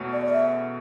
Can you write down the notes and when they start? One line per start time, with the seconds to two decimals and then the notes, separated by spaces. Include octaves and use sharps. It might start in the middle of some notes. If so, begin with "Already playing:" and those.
Already playing: E2 B2 A3 C#4
0.13 D5
0.26 D5
0.33 E5